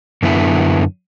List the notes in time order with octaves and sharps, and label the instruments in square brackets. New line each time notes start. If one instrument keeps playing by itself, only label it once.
[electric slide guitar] F#2 D3 B3 E4